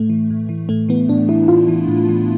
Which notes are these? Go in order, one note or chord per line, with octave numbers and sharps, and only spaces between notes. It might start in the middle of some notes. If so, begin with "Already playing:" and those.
Already playing: A2 A3
E3
A2
E3
A2 A3
E3 B3
A2 D4
E3 E4
A2 F4
E3
A2
E3